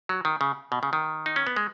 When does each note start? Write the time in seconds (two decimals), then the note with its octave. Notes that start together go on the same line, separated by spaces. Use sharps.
0.09 F#3
0.25 D#3
0.41 C#3
0.72 B2
0.83 C#3
0.93 D#3
1.26 D#4
1.36 C#4
1.47 B3
1.56 G#3